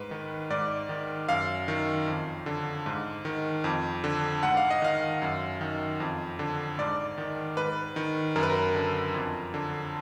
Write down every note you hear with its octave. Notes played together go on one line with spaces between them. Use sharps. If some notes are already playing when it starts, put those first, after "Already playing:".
Already playing: G#2 B4
D#3
G#2 D5
D#3
F#2 F5
D#3
F2
D3
G#2
D#3
F2
D3
G#2 F#5
F5
D#5
D#3 F5
F#2
D#3
F2
D3
G#2 D5
D#3
G#2 B4
D#3
F#2 A#4
B4
A#4
D3
F2
D3